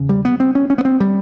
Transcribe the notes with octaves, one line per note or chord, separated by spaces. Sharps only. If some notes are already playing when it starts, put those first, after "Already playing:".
Already playing: E2 C#3
G3
B3
C4
C#4
C#4
B3
C4
G3